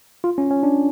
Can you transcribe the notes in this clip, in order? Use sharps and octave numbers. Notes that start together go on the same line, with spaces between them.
F4
C#4
C#4
D4